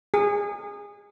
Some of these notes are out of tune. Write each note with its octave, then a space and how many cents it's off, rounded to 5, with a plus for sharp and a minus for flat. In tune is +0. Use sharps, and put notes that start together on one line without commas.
G#4 -25